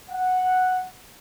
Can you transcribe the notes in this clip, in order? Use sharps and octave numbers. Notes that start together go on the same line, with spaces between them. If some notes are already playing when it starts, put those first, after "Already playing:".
F#5